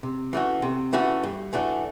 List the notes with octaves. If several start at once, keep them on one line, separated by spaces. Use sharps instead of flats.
C3
E3 A3 C#4 F#4
C3
E3 A3 C#4 F#4
G2
E3 A3 D4 F#4